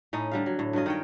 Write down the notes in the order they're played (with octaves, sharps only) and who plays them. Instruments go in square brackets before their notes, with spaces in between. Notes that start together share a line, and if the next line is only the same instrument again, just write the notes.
[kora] A2 C#4 D#4
D3 G3 F5
F#3
A2
G2 F#3 F4 D#5
D#3 C#5 G5